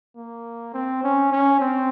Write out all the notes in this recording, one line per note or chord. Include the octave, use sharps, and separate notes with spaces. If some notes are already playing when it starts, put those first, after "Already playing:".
A#3
C4
C#4
C#4
C4